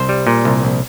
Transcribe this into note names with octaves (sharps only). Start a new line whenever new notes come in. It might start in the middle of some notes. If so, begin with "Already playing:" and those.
Already playing: C2 C5
G3
A#2
C2
A#1